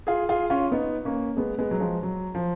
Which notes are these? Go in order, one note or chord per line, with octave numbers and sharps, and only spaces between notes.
F4 G#4
F4 G#4
C#4 F4
B3 D#4
A#3 C#4
G#3 B3
G#3 B3
F#3
F3 G#3
F#3
F3